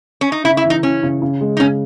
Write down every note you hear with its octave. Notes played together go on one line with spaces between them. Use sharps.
C#4
D#4
C#3 E4
E4
E3
D#4
E3 C#4
C#3
C#3
G#3
D#4
C#3 C#4